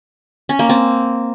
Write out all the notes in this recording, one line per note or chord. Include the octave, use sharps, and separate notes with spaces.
C#4
A#3
C4